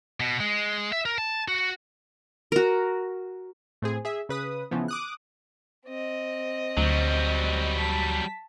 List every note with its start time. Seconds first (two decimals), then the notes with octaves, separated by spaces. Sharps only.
0.20 B2
0.40 G#3
0.92 E5
1.05 A#4
1.18 A5
1.48 F#4
2.52 F#4 A#4
3.82 A2 C4 G#4
4.05 G#4 E5
4.29 C#3 B4 D#6
4.71 C#3 E3 F3 B3
4.88 D6 D#6 F#6
5.86 C4 D#5
6.77 D2 F#3 G3
7.79 A5 B6